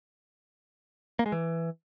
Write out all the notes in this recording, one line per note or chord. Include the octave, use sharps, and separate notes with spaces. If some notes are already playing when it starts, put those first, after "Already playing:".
A#3
G#3
E3